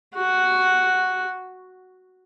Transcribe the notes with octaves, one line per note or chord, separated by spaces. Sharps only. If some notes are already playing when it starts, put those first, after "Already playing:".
F#4